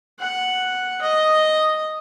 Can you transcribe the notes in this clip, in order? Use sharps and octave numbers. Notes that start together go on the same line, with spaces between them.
F#5
D#5